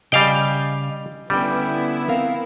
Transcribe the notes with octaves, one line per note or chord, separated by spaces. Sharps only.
C#3 G3 D#5 F5 G5 G#5
D3 G3 B3 C#4 E4 G5
C4 A#4 F5